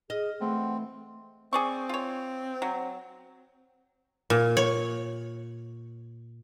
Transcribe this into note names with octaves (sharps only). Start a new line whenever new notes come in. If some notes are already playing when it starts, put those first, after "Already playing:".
G#4 D#5 F6
E3 A3 C4 F#5
C4 G#4 D5 C#6
F4 C#5
F#3
A#2
C#5